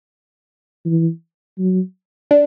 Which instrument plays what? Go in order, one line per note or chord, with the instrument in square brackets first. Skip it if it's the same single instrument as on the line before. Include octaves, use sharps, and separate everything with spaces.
[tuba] E3
F#3
[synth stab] D4